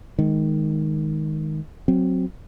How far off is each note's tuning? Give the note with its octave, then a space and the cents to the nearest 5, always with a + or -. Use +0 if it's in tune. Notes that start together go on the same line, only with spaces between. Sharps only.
D#3 +0 G#3 +5
F#3 +0 C4 +0